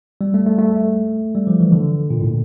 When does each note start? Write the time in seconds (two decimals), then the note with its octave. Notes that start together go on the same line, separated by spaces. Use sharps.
0.21 G3
0.34 A3
0.46 A3
0.58 A3
1.35 G3
1.47 F3
1.60 E3
1.72 D3
2.10 A#2
2.21 A2